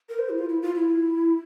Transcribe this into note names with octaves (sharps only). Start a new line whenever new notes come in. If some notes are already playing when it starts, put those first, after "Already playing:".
A#4
C5
E4
F4
E4
F4
E4